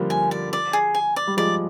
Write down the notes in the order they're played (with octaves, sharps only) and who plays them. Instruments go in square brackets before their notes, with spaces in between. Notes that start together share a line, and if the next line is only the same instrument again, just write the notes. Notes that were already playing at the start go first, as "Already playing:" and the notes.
Already playing: [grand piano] D3 F3 G3 A#3
[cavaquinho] G#5
D5
D5
G#4
G#5
D5
[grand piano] G3
[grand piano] F3 G#3 [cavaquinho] D5